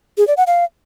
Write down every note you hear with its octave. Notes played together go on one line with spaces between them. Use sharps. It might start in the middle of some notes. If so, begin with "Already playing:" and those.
G#4
D5
F#5
F5